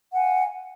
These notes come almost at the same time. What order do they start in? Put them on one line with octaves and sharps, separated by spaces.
F#5 G#5 F5